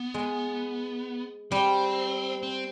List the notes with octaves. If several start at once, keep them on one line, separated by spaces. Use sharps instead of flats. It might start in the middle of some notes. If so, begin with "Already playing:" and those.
Already playing: B3
G#3
G3 C4
C4